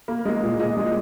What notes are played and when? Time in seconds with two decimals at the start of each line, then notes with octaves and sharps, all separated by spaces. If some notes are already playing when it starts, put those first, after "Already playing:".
0.08 A#3
0.25 G#3 D#5
0.43 A#2
0.59 A#2 D#5
0.77 G#3